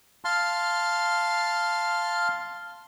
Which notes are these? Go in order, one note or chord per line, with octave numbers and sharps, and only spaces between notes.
F5 A5 C6 F6